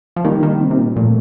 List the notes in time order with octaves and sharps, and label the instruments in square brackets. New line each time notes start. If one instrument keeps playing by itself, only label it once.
[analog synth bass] F3
[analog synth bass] D#3 [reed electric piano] G3 A#3
[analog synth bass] D#3
C3
C3
A#2
[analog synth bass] A#2 [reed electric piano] F3 A3